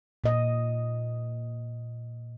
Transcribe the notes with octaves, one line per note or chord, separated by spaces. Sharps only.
A#2 D#5